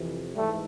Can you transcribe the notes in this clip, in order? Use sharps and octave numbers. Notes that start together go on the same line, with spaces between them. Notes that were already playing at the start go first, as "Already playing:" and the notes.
Already playing: F2 C3 E3
G#2 E3 G3 A3